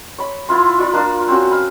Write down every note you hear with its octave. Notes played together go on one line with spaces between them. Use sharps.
C#5 B5
B3 E4 F4 C6
F4 D5 B5
A#3 D4 F5
C4 C#4 F#4
F5 B5